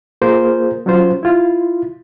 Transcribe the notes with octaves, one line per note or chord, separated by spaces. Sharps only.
A#3 F4 G#4 A#4 C5
F#3 C#4 F4 C5
E4 F4